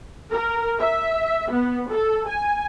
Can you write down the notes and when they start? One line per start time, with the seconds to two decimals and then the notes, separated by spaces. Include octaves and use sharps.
0.31 A#4
0.78 E5
1.50 B3
1.89 A4
2.27 G#5